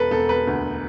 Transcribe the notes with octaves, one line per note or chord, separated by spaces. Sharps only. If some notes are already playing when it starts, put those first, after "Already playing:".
Already playing: E1 A4 B4
E1 A4
B4
D2